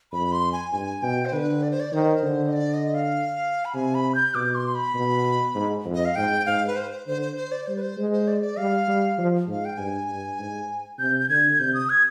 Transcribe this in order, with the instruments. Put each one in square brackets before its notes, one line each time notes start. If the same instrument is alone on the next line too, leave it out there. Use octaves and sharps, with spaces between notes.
[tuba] F2 [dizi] B5
[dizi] C6
G#5
[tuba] G2 [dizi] G#5
[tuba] B2 [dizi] G5
[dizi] C5
[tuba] D3 [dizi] B4
[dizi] D5
C5
D5
[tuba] D#3 [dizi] C5
[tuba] D3
[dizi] D#5
D5
D#5
F5
B5
[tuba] C3 [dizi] G#5
[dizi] B5
G6
[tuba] B2 [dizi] D6
[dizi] C6
B5
[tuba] B2
G#2
F2
[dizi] D#5
F5
[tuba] G#2 [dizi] G5
[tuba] G#2 [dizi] F5
[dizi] B4
C5
C5
[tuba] D3 [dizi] C5
[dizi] C5
C5
D5
[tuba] G3 [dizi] C5
[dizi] B4
C5
[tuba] G#3
[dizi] C5
D5
D5
[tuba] G3 [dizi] F5
[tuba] G3
F3
[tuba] G#2 [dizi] F5
[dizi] G5
[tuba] G2 [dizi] G#5
[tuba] G2
G#2
[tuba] C3 [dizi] G6
[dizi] G6
[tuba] D3 [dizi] G#6
[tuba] C3 [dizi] G6
[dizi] D#6
G#6